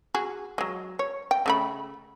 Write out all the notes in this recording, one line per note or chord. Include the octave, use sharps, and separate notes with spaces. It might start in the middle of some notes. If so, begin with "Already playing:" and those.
F#4 G#4
F#3 G#3
C#5
G5
C#3 A3 B5